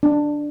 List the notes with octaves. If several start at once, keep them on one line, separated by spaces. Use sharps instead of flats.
D4